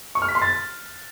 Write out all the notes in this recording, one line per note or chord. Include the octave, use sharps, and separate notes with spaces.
C#6
F6
B6
C6
A6